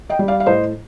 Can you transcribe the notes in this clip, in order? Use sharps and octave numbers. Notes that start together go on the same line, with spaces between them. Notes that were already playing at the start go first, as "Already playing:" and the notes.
D#5 G5
G3
D5 F5
F5
A2 C5 D#5